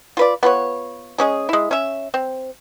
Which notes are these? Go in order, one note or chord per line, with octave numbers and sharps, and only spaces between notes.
F4 B4 D5
B3 F4 B4 C#5
G#3 C#4 G#4
G#3 E4
C#4 E5
C4